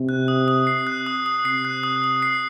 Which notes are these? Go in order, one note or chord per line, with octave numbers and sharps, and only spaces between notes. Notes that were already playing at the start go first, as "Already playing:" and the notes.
Already playing: C3
F#6
D#6
D#6
C7
F#6
D#6
D#6
C3 C7
F#6
D#6
D#6
C7